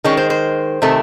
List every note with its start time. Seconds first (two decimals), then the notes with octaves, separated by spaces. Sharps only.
0.04 D#3 G#3 C#4
0.17 C5
0.30 C5
0.82 C3 D#3 A3